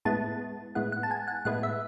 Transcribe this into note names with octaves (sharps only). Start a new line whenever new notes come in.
A2 G#3 B3 E4 A5
A2 G#3 B3 E4 F#5
F#5
A5
G#5
F#5
A2 G#3 B3 E4 F#5
E5